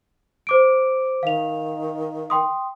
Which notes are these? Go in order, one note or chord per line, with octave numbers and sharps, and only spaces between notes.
C5 D6 D7
D#3 F5 F7
G5 C6 D#6